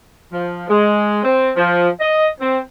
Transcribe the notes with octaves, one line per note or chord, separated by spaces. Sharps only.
F3
G#3
C4
F3
D#5
C4